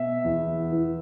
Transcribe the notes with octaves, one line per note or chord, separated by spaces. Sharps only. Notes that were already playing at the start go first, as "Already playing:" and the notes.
Already playing: B2 E5
E2
E3